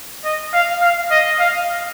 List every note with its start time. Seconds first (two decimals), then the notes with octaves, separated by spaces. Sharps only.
0.25 D#5
0.53 F5
0.81 F5
1.11 D#5
1.39 F5